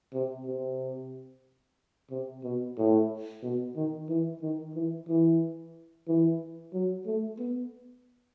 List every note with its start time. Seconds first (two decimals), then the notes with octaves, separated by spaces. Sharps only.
0.13 C3
0.45 C3
2.10 C3
2.44 B2
2.77 A2
3.43 B2
3.76 D#3
4.09 E3
4.42 D#3
4.75 E3
5.08 E3
6.08 E3
6.73 F#3
7.06 A3
7.39 B3